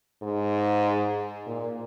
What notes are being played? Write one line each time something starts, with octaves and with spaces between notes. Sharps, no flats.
G#2
A#2